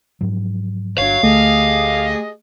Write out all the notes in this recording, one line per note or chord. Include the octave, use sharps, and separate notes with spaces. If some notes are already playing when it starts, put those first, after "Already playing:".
G#2 F3 F#3
G1 F#3 D4 C#5 F5
D2 A3 G4 G#4 D#5